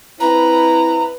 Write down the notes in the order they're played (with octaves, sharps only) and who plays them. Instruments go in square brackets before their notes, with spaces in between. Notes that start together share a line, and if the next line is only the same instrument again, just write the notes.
[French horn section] C4 E4 [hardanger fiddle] B4 [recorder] A#5